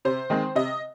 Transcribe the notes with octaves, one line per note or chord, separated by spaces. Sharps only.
C3 C5
D#3 G#3 C4
C3 D#5